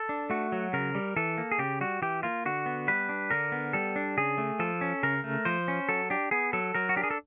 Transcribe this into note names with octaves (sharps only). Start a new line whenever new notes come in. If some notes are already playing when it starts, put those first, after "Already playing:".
Already playing: A4
D4
A3 F#4
F#3
C#3 A#4
G3
E3 A4
A#3
G#4
C#3 G4
G3 F#4
E3 G4
A#3 F4
D3 F#4
B3
G3 B4
D4
D3 A#4
B3
G3 A4
D4
C#3 G#4
A3
F3 A4
C#4
C#3 A#4
A3
F3 C5
C#4
F#3 A4
D4 G4
B3 G#4
F#3 A4
F#3 A#4
F#4
D4 G4
G#4
A4